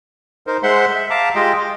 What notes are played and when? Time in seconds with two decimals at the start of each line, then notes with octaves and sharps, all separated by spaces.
0.47 D#4 A#4 C5
0.63 G#3 C5 E5 F#5 C6
0.96 E5
1.10 E5 F5 A5 A#5 D6
1.35 G#3 F4 G4 D#5 G5
1.59 D#5